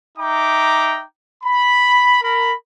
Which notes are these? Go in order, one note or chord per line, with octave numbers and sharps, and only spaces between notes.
D#4 E5 G5 A#5 D6
B5
A#4 B5